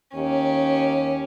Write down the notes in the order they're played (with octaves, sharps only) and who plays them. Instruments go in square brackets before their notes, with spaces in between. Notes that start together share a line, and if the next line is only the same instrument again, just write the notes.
[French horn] D#2 [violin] C#4 G4